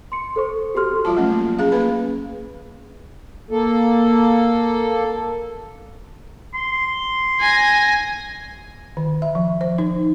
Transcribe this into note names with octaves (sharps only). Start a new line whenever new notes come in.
C6 C#7
A4 C5 C#6
F#4 G4 A4 C6 F6
F3 G3 F4 A5
F#3 A3 C#4
A#3
C#4 G#4 F5
A#3 B4 B5
A#3 A4
C6
G#5 A#6
D#3
E5
F3
C5
D#4